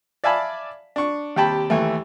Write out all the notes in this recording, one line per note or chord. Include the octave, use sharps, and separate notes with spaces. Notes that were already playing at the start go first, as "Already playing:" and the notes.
D5 E5 F5 G#5 A5 B5
D4 C#6
D#2 C3 G4 G5 A5 B5
D#2 E3 A3